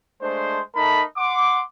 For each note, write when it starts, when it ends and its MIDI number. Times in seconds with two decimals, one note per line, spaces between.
0.22 0.60 56
0.22 0.60 57
0.22 0.60 62
0.22 0.60 72
0.75 1.03 57
0.75 1.03 63
0.75 1.03 70
0.75 1.03 81
0.75 1.03 83
1.17 1.61 78
1.17 1.61 84
1.17 1.61 86